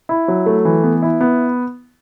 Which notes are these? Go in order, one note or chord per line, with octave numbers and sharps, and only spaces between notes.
E4
F#3
A3
E3
B3
E4
B3